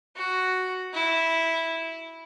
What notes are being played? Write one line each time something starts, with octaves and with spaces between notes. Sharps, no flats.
F#4
E4